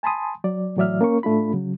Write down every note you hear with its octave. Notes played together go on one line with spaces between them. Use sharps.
G#5 A5 B5 C6 D#6
F#3 D5
A2 E3 F#3 D5 E5 F6
A#3 C#4 A#4 C#6
A2 A3 D4 F4 B5
C#3 F#3